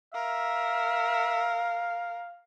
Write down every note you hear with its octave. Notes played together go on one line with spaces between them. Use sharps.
A#4 E5 F5